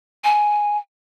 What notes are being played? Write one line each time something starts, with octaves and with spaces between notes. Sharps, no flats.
G#5